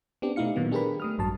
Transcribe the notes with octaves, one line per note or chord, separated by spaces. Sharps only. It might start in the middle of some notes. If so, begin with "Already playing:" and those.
B3 C4 D4 G4
B2 A3 D#4 E4 F5 C#7
A#2 D#3 F#3 B3
D4 G4 G#4 A#4 B4 B5
A3 D#6 F6
A1 G2 F#3 A5